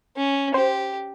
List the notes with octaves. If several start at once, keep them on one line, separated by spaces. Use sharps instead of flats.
C#4
G4 C5